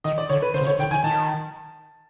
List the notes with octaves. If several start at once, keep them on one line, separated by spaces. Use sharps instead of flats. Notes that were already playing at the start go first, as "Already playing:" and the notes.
D#3 D#5
D5
D3 C#5
B4
D3 C5
C#3
D3 C#5
D3 G5
D#3 G#5
D#3 A5